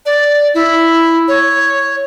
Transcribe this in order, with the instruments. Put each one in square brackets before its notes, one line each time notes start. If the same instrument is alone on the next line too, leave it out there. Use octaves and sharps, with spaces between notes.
[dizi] D5
E4
C#5